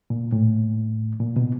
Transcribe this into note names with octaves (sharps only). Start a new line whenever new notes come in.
A#2
A2
A#2
B2